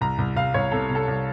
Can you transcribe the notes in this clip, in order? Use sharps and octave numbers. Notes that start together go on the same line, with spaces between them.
C2 A#5
C2
C2 F5
C2 C#5
C3 A4
C3 A4
C2